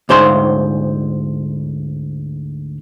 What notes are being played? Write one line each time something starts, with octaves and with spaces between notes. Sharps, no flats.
D2 G#2 C5 F5 C6